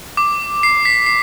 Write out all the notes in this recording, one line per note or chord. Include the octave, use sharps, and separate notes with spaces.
D6
C7
B6
C7